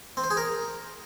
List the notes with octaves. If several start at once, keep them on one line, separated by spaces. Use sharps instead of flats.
C4
C5
G#4
A#4